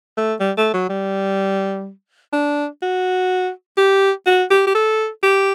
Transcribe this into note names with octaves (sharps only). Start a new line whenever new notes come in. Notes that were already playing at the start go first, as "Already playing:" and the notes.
A3
G3
A3
F#3
G3
D4
F#4
G4
F#4
G4
G4
A4
G4